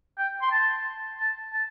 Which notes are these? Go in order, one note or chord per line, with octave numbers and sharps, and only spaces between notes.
G5
C6
A5
A5
A5